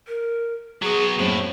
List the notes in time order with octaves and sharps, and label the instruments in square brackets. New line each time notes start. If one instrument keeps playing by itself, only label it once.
[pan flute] A#4
[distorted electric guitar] F#3 B3 [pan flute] G#4
[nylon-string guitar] F#2 C4 [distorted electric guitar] A2 [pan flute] A#3